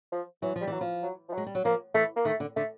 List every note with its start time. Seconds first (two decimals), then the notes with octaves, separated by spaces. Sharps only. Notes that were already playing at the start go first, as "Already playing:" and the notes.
0.12 F3
0.42 E3 F#3
0.56 F3
0.61 G3
0.67 E3 F#3
0.81 F3
1.03 F#3
1.29 F3
1.33 F#3
1.38 G#3
1.47 G3
1.55 F#3
1.65 F3 A#3
1.94 E3 A3
2.16 A#3
2.25 D#3 A3
2.40 D3
2.57 D3 A3